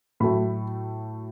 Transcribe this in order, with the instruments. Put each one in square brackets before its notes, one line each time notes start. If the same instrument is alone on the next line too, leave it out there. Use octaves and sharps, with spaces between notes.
[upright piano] A2 F#3 A3 B5